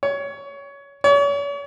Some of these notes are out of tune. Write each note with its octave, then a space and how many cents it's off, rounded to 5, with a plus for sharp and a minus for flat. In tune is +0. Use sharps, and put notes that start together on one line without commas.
C#5 +20
C#5 +40